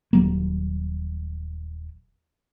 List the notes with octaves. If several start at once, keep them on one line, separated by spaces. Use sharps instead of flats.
D#1 F#3 A#3